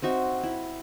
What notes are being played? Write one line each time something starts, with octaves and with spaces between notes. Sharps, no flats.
C4 D#4 F#4 E5
E4